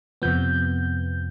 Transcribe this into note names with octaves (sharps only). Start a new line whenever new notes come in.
F2 C3 F3 B3 G6